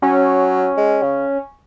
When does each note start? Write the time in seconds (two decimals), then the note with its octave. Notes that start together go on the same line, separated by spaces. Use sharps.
0.02 F#3 C#4
0.77 G#3
1.02 C#3